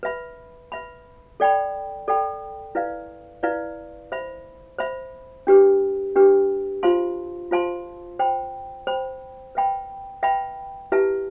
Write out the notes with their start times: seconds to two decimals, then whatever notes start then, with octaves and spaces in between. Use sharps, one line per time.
0.03 B4 E5 B5
0.72 B4 E5 B5
1.40 A4 D5 G5 B5
2.08 A4 D5 G5 B5
2.75 E4 B4 D5 F5
3.43 E4 B4 D5 F5
4.12 C5 E5 B5
4.79 C5 E5 B5
5.47 D4 G4 B4
6.16 D4 G4 B4
6.83 F4 C5 F5 A5 C6
7.51 F4 C5 F5 A5 C6
8.19 C5 G5 B5
8.87 C5 G5 B5
9.55 B4 E5 G5 B5
10.23 B4 E5 G5 B5
10.92 E4 G4 B4 E5 A5